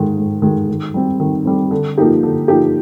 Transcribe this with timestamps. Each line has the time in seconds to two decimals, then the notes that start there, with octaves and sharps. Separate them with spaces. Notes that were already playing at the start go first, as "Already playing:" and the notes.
Already playing: G#2 D#3 G#3
0.17 G#2
0.42 D#3 G#3
0.68 D#3
0.94 G3 C4
1.20 D#3
1.45 G3 C4
1.71 D3
1.98 F3 A#3 D#4 G4
2.23 D3
2.48 F3 A#3 D#4 G4